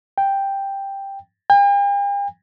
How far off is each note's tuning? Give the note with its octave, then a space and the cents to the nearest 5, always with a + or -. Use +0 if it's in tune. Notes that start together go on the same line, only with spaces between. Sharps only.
G5 +5
G5 +45